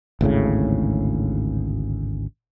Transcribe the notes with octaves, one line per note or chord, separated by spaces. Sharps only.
G#1 D2 A2 C#3